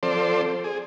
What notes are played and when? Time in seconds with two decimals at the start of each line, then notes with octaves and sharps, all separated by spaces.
0.03 F3 C4 A4 C5 D5
0.64 G#4